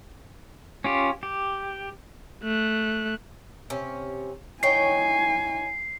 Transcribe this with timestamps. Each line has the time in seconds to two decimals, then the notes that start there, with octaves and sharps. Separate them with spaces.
0.84 C#4 F4 G4
1.23 G4
2.43 A3 F#6
3.70 C3 C#4
4.63 D#4 E4 C#5 G5 G#5 C7